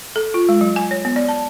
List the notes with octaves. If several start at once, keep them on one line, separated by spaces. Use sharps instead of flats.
A4
F4
G#3
F#3
G#5
C#5
B3
D5
A5